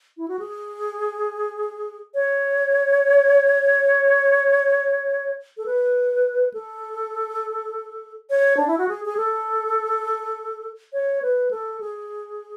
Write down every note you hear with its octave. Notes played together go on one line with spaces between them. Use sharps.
E4
F#4
G#4
C#5
A4
B4
A4
C#5
D4
E4
F#4
G#4
G#4
A4
C#5
B4
A4
G#4